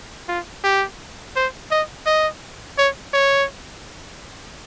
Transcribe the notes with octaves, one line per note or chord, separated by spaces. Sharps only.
F4
G4
C5
D#5
D#5
C#5
C#5